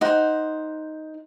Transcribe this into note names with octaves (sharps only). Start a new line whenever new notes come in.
D#4 C5 F#5